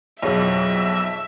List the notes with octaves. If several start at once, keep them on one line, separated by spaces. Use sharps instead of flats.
B1 F2 F#3 G#4 B4 C#5 E5 F5